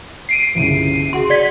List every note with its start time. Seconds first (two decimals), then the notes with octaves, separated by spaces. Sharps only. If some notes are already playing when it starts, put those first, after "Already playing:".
0.29 C7 D7 D#7
0.55 G1 C2 C#3
1.13 F#4 G#4 F#5 C6
1.30 D5 G#6 B6